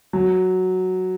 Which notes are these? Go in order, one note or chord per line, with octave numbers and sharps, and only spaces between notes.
F#3